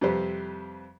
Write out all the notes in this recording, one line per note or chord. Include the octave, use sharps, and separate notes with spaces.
F2 C3 G3 G4 B4 C5